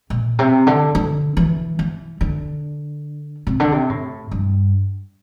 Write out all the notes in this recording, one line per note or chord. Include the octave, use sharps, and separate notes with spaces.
A#2
C3
D3
D3
E3
E3
D3
C3
D3
C3
A2
G2